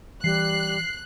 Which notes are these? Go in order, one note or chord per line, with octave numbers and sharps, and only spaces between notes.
E3 G3 F#6 C7